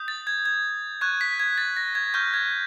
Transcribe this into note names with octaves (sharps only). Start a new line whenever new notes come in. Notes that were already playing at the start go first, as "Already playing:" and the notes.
Already playing: D#6 G6
A6
G#6
G#6
C#6 F#6 G#6
B6
G#6
A6
A#6
G#6
C#6 F6 G6
G#6